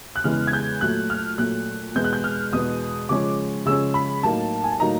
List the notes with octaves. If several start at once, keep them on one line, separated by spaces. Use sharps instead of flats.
F#6
E2 C#3 E3 G#3 F6
G#6
G6
A#2 F#3 A3 F#6
F6
A#2 F#3 A3 F#6
E2 B2 G#3 B3 G6
F#6
G6
F6
E2 B2 G#3 B3 D#6
C#3 F3 G#3 C#4 D6
C#3 F3 G#3 C#4 E6
B5
A2 F#3 A#3 D#4 A5
G#5
A5
A2 F#3 A#3 D#4 A#5